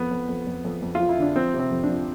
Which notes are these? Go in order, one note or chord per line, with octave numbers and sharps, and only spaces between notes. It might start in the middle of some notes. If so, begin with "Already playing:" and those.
Already playing: F2 B3
F2
F2
F2
F2
F2
F4
F3
E4
D3 D4
F3 C4
C3
C4
F2
D4
F3